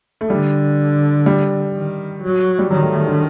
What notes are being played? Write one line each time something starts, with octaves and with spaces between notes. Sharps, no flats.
A3
D3 G3
G3
D#3
F#3
G3
D#3 F#3
A3
A3
D3